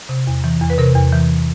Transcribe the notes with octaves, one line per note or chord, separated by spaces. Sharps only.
C3
E2
E3
E2
B4
C3 A#4
E2
E3